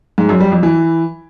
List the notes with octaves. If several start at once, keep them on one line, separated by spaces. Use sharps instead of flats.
G#2
F#2
G3
F2
E3